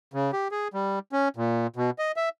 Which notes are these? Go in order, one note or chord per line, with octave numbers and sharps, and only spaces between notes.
C#3
G4
G#4
G3
C#4
A#2
B2
D#5
E5